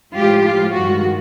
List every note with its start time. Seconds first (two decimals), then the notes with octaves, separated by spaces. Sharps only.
0.15 A2 F3 G#3 F4 G4
0.44 F4
0.73 G2 D#3 G#3 F#4